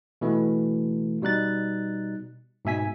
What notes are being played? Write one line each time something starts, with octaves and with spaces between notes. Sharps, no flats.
B2 E3 A3
B2 G3 D#4 F#6 A6
G#2 B2 E5 G#5 B6